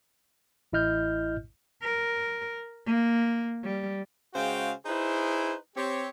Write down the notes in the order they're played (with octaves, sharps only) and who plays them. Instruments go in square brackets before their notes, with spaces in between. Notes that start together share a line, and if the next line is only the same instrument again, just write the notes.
[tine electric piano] A1 E4 D#5 F6 G6
[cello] A#4
A#3
G3
[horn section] C#3 G#3 F#4 C5 F5 G5
D#4 E4 G#4 B4 C5
C4 G4 C#5